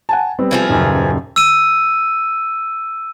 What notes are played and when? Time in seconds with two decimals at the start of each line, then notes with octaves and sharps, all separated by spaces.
0.09 F#5 G#5 A5
0.39 G3 B3 C4
0.51 E3 F3 G#4
0.69 D#1 F#2 C#3
1.36 E6 D#7